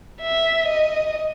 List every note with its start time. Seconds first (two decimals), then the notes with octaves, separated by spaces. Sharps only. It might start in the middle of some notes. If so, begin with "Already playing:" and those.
0.21 E5
0.69 D#5